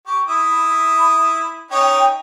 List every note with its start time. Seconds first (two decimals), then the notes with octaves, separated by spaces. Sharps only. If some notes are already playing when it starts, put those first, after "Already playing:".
0.07 G4 C#6
0.28 E4 E5 B5 D#6
1.71 C#4 D#4 C#5 G5